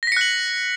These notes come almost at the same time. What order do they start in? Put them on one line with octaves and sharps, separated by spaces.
A#6 B6 C#7 F#6 F#7